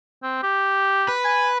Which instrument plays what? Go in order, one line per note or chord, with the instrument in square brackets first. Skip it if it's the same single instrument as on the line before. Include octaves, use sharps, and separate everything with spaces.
[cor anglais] C4
G4
[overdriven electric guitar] B4
[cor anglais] G#5